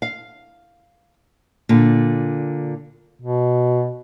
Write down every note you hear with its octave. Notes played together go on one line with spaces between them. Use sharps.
F5
A#2 D3
B2